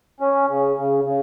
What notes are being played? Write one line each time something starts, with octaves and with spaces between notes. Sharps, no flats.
C#4
C#3
C#3
C#3